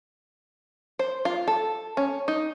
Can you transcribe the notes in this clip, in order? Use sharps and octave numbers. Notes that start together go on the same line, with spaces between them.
C5
F4
A4
C#4
D#4